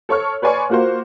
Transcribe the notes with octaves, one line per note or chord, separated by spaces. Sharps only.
A4 C#5 C#6 F6
B4 C#5 D5 G#5 C6 C#6
A#3 F4 F#4 A#4 C5